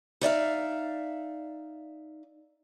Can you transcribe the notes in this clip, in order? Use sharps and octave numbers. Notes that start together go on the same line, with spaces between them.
D#4 D5 E5 F5